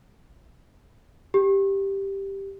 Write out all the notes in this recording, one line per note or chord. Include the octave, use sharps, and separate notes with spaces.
G4